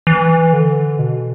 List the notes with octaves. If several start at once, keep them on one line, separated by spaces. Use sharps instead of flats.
E3
D3
B2